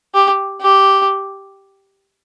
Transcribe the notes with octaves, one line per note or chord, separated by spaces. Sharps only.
G4
G4